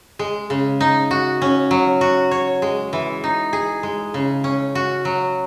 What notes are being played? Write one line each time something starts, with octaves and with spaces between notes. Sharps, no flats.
G#3
C#3
D#4
F#4
C#4
F#3
F#4
C#5
G#3
E3
D#4
G#4
G#3
C#3
C#4
F#4
F#3